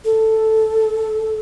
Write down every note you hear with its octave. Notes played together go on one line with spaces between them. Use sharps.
A4